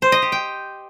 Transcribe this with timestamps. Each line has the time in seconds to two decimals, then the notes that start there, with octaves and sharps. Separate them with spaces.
0.02 C5
0.12 D#5
0.22 G4
0.32 G5